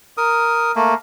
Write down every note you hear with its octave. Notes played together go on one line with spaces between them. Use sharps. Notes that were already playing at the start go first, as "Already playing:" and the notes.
A#4 D#6
A3 A#3